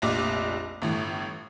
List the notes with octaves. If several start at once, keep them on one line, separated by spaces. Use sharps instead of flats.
F1 A#1 D#5 D6
G1 A2 E3